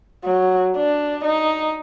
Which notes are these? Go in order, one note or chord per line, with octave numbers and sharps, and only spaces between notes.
F#3
D4
D#4